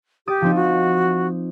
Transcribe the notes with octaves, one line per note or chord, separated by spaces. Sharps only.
G4 D6 D#6 A6
F3 C4 D#4
F#4